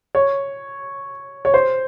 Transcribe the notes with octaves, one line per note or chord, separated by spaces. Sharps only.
C#5
C#5
C5